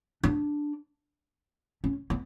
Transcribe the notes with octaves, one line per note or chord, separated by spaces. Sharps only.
D4
C#4
B3